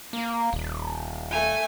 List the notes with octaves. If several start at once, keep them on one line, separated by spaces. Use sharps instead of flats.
A#3
D#1
A3 G#5